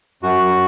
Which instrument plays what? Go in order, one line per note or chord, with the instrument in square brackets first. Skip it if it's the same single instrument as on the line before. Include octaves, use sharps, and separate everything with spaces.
[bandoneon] F#2 F#4